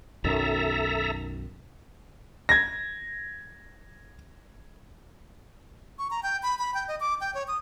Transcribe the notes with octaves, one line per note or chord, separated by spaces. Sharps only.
B1 F#2 D#3 A4 E5 A#5
G#6 A#6
C#6
A#5
G5
B5
B5
G5
D#5
D6
G5
C#5
D#6